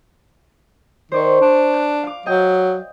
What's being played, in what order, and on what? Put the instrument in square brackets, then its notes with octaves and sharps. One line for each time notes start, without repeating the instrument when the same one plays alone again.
[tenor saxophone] D#3 [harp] C5 D5 C#6
[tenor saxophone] D4
[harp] F#6
F5 D6
[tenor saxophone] F#3 [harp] D#5 G5